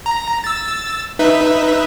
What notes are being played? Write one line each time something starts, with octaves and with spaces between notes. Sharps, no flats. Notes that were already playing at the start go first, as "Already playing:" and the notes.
A#5
E6 A6
D#4 B4 E5